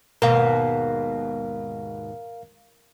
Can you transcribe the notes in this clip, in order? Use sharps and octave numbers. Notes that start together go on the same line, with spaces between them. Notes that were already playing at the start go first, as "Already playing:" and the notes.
D#2 G#2 B2 A#4 F5